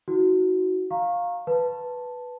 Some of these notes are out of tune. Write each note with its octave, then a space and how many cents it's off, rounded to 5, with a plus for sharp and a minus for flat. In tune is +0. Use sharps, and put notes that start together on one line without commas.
D#4 +45 F#4 +0
F5 +10 A#5 -5 C#6 -25
B4 +0 A5 +0